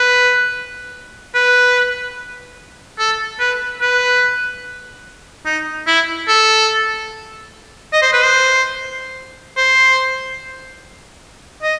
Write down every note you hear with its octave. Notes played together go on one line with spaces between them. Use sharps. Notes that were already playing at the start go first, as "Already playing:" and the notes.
Already playing: B4
B4
A4
B4
B4
D#4
E4
A4
D#5
C5
B4
C5
C5
D#5